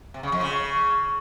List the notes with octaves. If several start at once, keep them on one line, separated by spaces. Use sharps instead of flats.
C3
C#3
F2
C#3